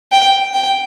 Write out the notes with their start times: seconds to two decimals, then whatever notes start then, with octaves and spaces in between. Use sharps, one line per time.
0.12 G5
0.53 G5